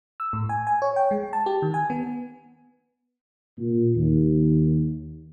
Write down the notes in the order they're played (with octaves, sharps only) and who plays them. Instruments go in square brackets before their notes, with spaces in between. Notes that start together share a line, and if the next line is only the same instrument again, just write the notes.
[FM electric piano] E6
A2
G#5
G#5
C#5
G5
G#3
A5
G4
D#3
G#5
B3
[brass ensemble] A#2
D#2